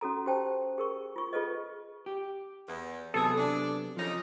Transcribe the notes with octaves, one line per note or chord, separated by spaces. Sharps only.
C#4 F#4 A4 A#5
G4 C5 G5 A5
G#4 A#4 C#6
F4 C#6
F4 G#4 A4 B4 D#5
G4
E2
C3 E3 F#3 B3 G#4 A4
D4
C#3 F3 D#4